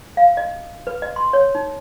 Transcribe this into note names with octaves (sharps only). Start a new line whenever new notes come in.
F5
D#5
B4
D#5
C6
C#5
D#4